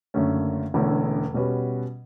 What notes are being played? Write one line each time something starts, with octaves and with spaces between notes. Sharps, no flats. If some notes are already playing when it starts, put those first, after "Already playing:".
F#1 F#2 D3 A3 C#4
E1 E2 D3 A3 C#4
B2 G3 C#4 F#4 B4